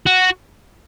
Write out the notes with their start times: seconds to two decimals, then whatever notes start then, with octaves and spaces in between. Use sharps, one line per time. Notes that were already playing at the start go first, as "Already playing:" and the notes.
0.06 F#4